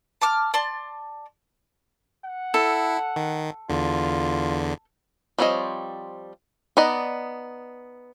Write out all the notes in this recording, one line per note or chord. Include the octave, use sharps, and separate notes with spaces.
A5 D6 F6
D5 A5 C6
F#5
E4 A4
D#3
E2 D3 F4
F3 G3 C4 C#5 D#5
B3 D#4 D5 D#5